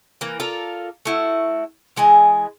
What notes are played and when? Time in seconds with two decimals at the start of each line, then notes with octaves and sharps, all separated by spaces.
0.21 E3 A#3
0.40 F4 A4 A#4 D5
1.05 A3 E4 F#4
1.96 E3 G#3 D#5 G#5